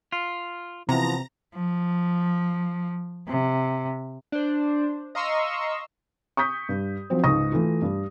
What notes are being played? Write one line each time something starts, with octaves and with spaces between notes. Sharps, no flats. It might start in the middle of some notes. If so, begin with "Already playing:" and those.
F4
C3 E3 F3 B3 A#5 A#6
F3
C3
D4 C5
D#5 F5 A#5 C6 C#6 E6
C#6 D#6 G6 B6
G2
F3 F#3 C4 C5
C#2 G#2 D#4 C#6 D#6 A#6
E3 A3 F4
G2